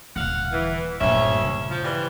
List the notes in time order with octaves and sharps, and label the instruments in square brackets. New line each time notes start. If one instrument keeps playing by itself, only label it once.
[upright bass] D#1 D3 [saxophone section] F5 F#5
[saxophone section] E3
[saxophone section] D2 C#4 E5 [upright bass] G2 A#2
[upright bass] C#3
[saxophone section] F3
E3 G3 F4